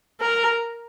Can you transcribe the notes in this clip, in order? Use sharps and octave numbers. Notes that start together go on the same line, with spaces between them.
A#4